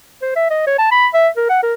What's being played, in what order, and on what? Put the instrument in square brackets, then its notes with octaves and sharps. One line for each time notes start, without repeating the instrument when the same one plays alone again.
[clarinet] C5
E5
D#5
C#5
A5
B5
E5
A#4
F#5
A#4